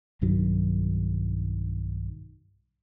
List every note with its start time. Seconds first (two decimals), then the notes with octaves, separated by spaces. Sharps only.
0.21 B1 G2 D#3 F#3